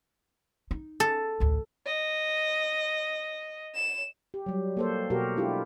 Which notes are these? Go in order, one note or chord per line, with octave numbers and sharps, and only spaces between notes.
D#4
A4
A1 D2
D#5
E7
G4
F#3 G3
A#3 A4 C5
B2 F#4 G4 A#4
G#3 D4 E4 F4 G4